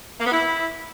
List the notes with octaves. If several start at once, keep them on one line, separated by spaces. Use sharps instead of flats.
A#3
B3
E4